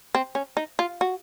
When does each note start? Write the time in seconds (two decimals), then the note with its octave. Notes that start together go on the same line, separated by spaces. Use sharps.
0.14 C4
0.35 C#4
0.57 D#4
0.79 F4
1.01 F#4